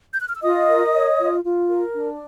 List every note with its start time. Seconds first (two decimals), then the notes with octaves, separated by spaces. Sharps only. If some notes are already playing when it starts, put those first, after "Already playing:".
0.13 G6
0.21 F#6
0.28 F6
0.35 E6
0.43 F4 D#5 D#6
0.68 A#4
0.93 C#5
1.19 F4
1.44 F4
1.70 A#4
1.95 D4